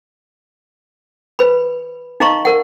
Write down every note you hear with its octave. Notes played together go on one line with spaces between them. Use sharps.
B4 B5
D#4 D#5 F5 A#5 C6 C#6
A#4 F#5